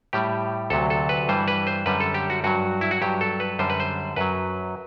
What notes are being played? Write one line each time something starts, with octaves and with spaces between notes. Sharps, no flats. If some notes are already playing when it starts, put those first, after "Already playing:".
A2 G3 G4
D2 C3 F#3 A4
A4
B4
G2 E3 G3 C5
B4
C5
F#2 D3 G3 B4
A4
G4
F#4
G2 F#3 F#4
E4
F#4
G2 F#3 G4
A4
B4
F#2 D3 G3 C5
B4
C5
F#2 F#3 B4